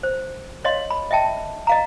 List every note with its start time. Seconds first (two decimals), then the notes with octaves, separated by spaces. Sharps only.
0.03 C5
0.64 C#5 D#5 F5 C6
0.90 B5
1.11 D#5 E5 G5 A5
1.67 D#5 F5 A#5